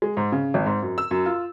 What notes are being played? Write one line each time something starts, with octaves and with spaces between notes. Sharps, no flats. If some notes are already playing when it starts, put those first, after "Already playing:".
G#3
G#2
C#3
G#1
G#2
F#2
E6
F#2
F4